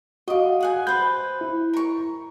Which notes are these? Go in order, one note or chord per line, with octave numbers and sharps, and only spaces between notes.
F#4 D#5 F5 D6
G#4 F#5 G#5
B4 C5 G6
E4
A#4 C#6